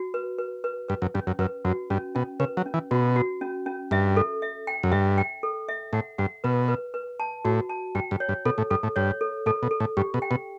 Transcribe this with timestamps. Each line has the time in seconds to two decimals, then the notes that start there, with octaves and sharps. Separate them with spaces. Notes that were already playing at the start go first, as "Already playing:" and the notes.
Already playing: F#4
0.14 B4
0.39 B4
0.64 B4
0.88 G2 B4
1.02 F#2
1.14 G2 C#4
1.27 F#2
1.39 F#2 B4
1.65 F#2 F#4
1.90 G2 C#4
2.15 B2 C#4
2.40 C#3 B4
2.57 F#3
2.66 C#4
2.74 E3
2.91 B2 F#4
3.16 F#4
3.41 C#4
3.66 C#4
3.91 G2 E5
4.17 A4
4.42 E5
4.67 G5
4.83 F#2
4.92 G2 E5
5.18 G5
5.43 A4
5.69 E5
5.93 A2 F#5
6.18 G2 F#5
6.44 B2 B4
6.68 B4
6.94 B4
7.20 A5
7.45 A2 F#4
7.70 A5
7.95 G2 G5
8.11 G2
8.20 C#5
8.29 G2
8.45 B2 A4
8.58 A2
8.70 G2 A4
8.83 A2
8.96 G2 C#5
9.21 A4
9.46 A2 A4
9.63 B2
9.71 A4
9.80 A2
9.97 G2 G4
10.14 B2
10.22 G5
10.31 B2